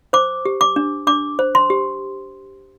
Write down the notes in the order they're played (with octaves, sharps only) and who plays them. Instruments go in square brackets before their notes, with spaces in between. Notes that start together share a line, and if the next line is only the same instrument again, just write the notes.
[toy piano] C5 D6
G4
D6
D4
D4 D6
C5
C6
G4